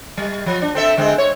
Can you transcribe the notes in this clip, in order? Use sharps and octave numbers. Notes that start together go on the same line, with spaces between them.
G3
F3
D4
C4 A4 E5
D3 G#3 C4
C#5